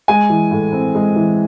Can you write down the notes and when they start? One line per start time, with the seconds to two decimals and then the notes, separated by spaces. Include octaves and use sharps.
0.08 G#3 G#5
0.30 E3
0.51 A2
0.72 C4
0.95 G#3
1.16 E3